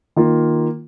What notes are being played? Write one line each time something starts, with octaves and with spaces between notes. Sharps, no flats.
D#3 A#3 F4